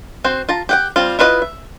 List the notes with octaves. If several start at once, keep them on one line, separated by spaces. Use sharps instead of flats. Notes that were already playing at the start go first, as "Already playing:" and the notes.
C4 F#4 C5
F4 A5 A#5
G4 F#5 G5
G3 C4 F4
E4 F4 B4 D5 D#5
E5